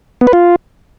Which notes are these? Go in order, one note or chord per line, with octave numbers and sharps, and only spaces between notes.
B3
B4
F4